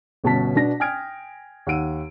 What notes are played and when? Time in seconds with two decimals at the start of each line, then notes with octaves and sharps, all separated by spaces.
0.24 G1 B2 C#4 A5 B6
0.56 B2 B3 D4 A#6
0.80 G5 G#5 D#6 F6 G#6 D7
1.67 D#2 F#5 E6 D7 D#7